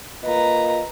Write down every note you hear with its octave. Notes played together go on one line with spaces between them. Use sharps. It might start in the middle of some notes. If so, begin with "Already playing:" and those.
A#3 F4 B4 D#5 A#5